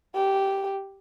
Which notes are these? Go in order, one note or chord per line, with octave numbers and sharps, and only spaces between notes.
G4